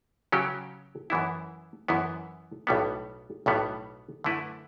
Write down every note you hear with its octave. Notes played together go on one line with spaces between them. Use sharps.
C#3 F#3 C#4 G4
F#2 E3 B3 E4
F#2 E3 B3 E4
B1 A2 G3 B3
B1 A2 G3 B3
F#2 D3 A3 E4 B4